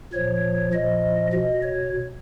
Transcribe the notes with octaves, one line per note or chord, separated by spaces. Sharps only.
A#2 F3 C#5
A#2 F3 D#5
B2 D#5
C#5